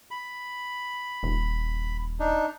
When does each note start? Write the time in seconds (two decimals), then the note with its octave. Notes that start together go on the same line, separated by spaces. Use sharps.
0.11 B5
1.23 D#1
2.20 D4 D#4